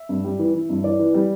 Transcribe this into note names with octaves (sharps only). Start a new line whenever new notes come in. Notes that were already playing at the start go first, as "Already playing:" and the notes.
Already playing: E5
G2
G3
E3
E3
G2
E3 D5
E3
G3